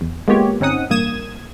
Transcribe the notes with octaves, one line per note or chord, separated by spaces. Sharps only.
E2
G#3 A#3 B3 F4 G4 C#5
G1 C4 C#4 D#4 F#5 D#6
A1 G2 A#3 D#6 G#6 E7